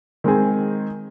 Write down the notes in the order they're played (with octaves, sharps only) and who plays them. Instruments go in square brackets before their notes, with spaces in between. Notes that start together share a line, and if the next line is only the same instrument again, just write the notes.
[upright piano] D#3 G#3 C4 G#4